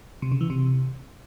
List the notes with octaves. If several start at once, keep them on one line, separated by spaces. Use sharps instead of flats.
C3
C#3
E3
C3